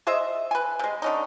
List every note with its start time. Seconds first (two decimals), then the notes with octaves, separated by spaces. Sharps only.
0.07 G#4 C5 D#5 E5
0.51 B4 G#5
0.79 C3 G#3
1.02 D3 C#4 D#4